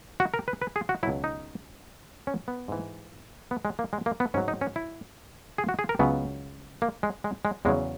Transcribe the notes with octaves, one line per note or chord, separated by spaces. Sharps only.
F#4
A#4
B4
B4
G#4
F#4
C#2 B2 F#3 E4
D#4
C#4
B3
G#2 E3
B3
G#3
A#3
G#3
A#3
B3
G#2 F#3 C#4
D#4
C#4
E4
G#4
F#4
G#4
A#4
C#2 C#3 F#3 B3
A#3
G#3
G#3
G#3
E2 C#3 F#3 G#3